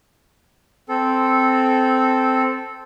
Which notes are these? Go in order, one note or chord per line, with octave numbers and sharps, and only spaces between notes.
C4 A4